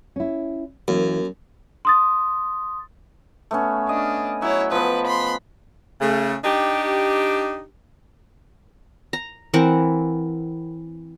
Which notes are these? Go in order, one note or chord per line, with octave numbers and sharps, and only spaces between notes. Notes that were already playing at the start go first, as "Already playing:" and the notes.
C#4 E4
F#2 E3 A#3
C6 D#6 A6
A3 B3 C#4
D4 D#5
F#3 E4 C#5
F3 B3 B4
B5 C6
C#3 A3
D4 D#4 G4
A#5
E3 C4 A#4 F#5